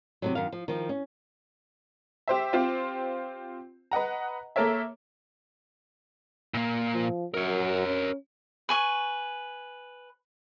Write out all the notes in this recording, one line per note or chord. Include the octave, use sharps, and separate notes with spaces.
C3 D#3 F#3
F#2 D#3 F5
F3
D#3 F3
C#4
G4 C5 E5
C4 F4 G4 C5
B4 D#5 F#5 A#5
A#3 A4 A#4 C#5 E5
A#2 A#3
F3
F#2 A#4 C#5
C#4
B4 G#5 C#6